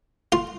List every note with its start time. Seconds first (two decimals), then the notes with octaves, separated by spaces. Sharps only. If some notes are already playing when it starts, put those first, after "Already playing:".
0.32 F4